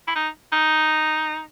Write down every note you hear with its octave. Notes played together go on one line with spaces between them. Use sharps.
E4
D#4
D#4